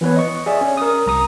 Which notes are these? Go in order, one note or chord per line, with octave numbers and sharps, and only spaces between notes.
E3 B3 B4 C#5
D#5 C#6
G#4 D5 E5
C#4
A#4 D#6
C2 A#5 D#6